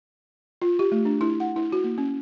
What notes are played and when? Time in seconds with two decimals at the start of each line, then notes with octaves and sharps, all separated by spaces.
0.62 F4
0.79 G4
0.92 A3
1.05 D4
1.21 E4
1.40 F#5
1.56 E4
1.72 F#4
1.84 A#3
1.98 C#4